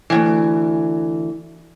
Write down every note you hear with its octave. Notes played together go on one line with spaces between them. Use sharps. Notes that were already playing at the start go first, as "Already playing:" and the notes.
D2 G2 E3